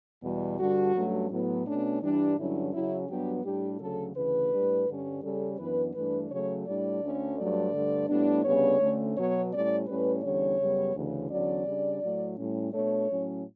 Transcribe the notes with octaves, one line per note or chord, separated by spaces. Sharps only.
E2 B2 G3
G2 D3 G3 D4 F#4
G2 F#3 A3 C#4
A2 F#3 B3
B2 A3 C#4 D4
G2 E3 G3 D4
G2 D3 F#3 C#4 E4
C#3 F#3 C#4 E4
G2 F#3 B3 D4 G4
A2 G3 D4 G4
D2 C#3 F#3 A4
D2 C#3 E3 B4
A2 G3 D4
G2 D3 G3 C#4
C#3 G3 C#4 A4
F#2 E3 B3 D4 B4
G2 E3 A3 D4 B4
C#3 F#3 A3 C#5
A2 G3 D4 D5
D2 D3 A3 C#4
G2 F#3 A3 D5
G2 D3 A3
A2 G3 B3 D4
D2 C#3 G3 B3 D4 C#5
D2 D3 A3 C#4
B2 F#3 B3 C#5
A2 G3 C#4 D5
A2 G3 C#4 B4
E2 D3 G3 C#4 C#5
F#2 C#3 G3 B3
D2 C#3 E3
E2 D3 F#3 C#4 D5
C#3 G3 D4
A2 F#3 A3
A2 G3 C#4
B2 A3 D4 C#5
A2 F#3 C#4